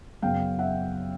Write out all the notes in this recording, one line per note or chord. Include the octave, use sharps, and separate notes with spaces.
F#2 C#3 F#3 B3 F5 G5
E5 F#5